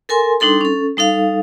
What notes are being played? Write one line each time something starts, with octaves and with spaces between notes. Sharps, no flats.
A4 A#4 G#5 C6
G3 D4 D#4 A4 C6
C#4 A4
G3 D#4 A4 F5